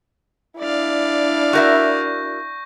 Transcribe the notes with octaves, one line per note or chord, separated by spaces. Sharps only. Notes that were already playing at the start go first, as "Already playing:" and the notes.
D4 E4 D5 F5
F#4 A#4 E5 C#6 G6 A#6